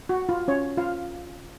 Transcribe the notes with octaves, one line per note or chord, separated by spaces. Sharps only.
F#4
F4
C#4 C#5
F4 F5